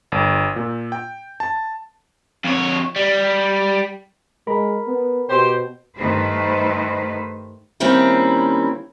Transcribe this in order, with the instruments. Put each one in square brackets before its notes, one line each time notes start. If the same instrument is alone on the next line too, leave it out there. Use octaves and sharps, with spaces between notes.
[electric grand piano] G1
A#2
G5
A5
[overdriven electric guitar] F2 C#5
G3
[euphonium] G#3 [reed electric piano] A#4 B5
[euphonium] B3
[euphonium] B2 [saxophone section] G4 C5
[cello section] G2 D#3 A3 B4 C5
[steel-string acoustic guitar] D#3 G3 A#3 C4 C#4 E4